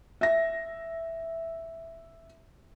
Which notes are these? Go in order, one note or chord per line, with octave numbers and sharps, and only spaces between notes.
E5 A#6